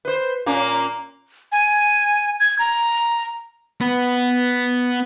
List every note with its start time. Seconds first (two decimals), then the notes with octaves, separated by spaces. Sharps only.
0.05 B4 C5
0.46 A#2 A#3 C#4
1.52 G#5
2.40 G#6
2.59 A#5
3.81 B3